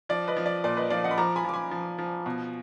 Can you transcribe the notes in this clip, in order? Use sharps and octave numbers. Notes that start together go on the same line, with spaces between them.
F3 D5
B4 D#5
F3
D5
A#2 D5
B4 D#5
F3 D5 F5
D#5 F#5
B5
F3 A#5 D6
G#5 B5
F3 D6
G#5 B5
F3
F3
B2